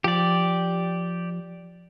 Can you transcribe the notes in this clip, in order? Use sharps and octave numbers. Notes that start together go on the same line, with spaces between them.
F3 G4 D5